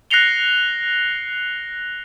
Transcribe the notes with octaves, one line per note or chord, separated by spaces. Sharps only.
F#6 A#6 C7 C#7 F7 G7